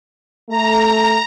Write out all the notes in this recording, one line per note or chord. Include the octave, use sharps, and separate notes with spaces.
A3 A#5